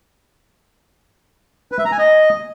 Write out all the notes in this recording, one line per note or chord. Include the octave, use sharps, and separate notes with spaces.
B4
E5
A#5
G#5
D#5